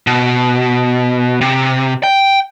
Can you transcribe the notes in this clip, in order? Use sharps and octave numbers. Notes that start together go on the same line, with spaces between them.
B2
C3
G5